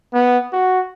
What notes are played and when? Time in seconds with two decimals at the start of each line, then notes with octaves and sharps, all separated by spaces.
0.13 B3
0.52 F#4